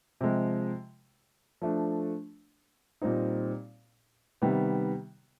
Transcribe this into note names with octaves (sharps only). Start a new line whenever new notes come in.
C3 F3 G#3
F3 A3 D4
A#2 G3 C4 D#4
C3 D#3 G3 B3